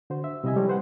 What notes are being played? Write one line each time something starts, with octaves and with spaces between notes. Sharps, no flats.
D3 F#4 C5
E5
C3 G3 E4 D#5 E5 G#5
F3 G3 G#3 A4 C5 C#5
B4 C5 F#5